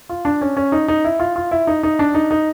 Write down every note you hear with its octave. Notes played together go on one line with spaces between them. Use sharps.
F4
D4
C#4
C#4
D#4
D#4
E4
F4
F4
E4
D#4
D#4
D4
D#4
D#4